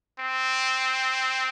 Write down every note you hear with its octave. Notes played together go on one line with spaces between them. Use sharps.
C4